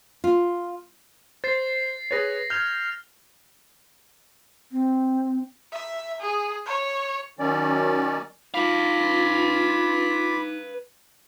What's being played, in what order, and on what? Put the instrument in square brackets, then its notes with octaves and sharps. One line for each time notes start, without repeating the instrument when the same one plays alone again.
[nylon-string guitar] F4
[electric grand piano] C5 [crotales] A6 C7
[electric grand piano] G#4 B4 C#5 [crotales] A6 A#6
[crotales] F6 F7 [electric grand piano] G6 G#6
[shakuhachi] C4
[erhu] E5
G#4
C#5
[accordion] D#3 F#3 C#4 D5
[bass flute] D#4 [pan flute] F4 [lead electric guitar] B4 F5 [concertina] B5 D6